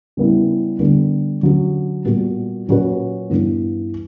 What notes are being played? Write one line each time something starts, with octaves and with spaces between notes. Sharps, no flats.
C#3 G3 B3 E4
D3 G3 B3
D3 F#3 C#4 F#4
A#2 G3 B3 F#4
A#2 F#3 C#4 F#4 B4
G2 E3 B3